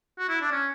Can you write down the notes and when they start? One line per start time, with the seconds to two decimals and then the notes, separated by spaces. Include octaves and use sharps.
0.18 F#4
0.29 E4
0.41 D4
0.51 C#4